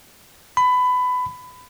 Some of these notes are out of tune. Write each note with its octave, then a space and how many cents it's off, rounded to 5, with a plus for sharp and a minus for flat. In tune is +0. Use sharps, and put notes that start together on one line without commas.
B5 +20